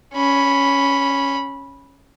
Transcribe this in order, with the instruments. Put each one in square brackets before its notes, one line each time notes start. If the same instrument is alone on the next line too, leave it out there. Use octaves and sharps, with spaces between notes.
[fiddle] C#4 B5